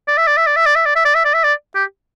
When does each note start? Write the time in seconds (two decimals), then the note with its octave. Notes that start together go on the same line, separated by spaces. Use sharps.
0.08 D5
0.17 E5
0.27 D5
0.37 E5
0.47 D5
0.56 E5
0.66 D5
0.76 E5
0.86 D5
0.96 E5
1.05 D5
1.15 E5
1.25 D5
1.34 E5
1.44 D5
1.75 G4